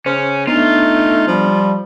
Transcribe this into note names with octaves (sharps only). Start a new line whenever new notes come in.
C#3 C#4 C5
A3 B3 D4 D#4 F4
F3 G3